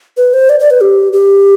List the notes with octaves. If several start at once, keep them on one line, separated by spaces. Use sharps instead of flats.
B4
C5
D5
D5
B4
G4
G4